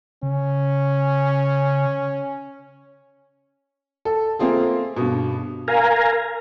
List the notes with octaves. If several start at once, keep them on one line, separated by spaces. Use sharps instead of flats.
C#3 C#4
A4
A3 A#3 C4 F4 G#4
G2 B2
A#4 F5 G#5 A#5